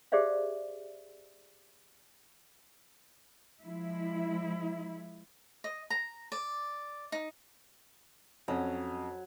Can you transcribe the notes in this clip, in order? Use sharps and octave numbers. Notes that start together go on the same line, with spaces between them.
G4 G#4 C5 D5 E5 F5
F3 G#3 E4
D#5
A#5
D5
D#4
F2 F#3 C#4